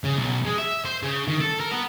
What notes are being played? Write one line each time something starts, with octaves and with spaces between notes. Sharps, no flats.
C#3
B1
G#3
E5
C5
C#3
D#3
A4
A#4
B3